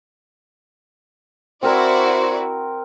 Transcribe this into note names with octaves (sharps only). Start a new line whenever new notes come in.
C4 E4 F#4 A#4 C5 D5